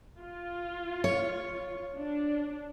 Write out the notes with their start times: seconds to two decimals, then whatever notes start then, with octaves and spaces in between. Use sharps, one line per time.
0.19 F4
1.04 C#5
1.98 D4